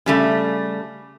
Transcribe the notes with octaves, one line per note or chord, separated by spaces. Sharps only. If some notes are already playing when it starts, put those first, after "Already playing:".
C#3 G3 A3